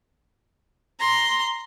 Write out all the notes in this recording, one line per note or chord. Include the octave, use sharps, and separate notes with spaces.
A#5 C6